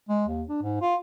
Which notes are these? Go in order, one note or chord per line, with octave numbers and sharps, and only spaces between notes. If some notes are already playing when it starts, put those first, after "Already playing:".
G#3
D#2
D4
G#2
F4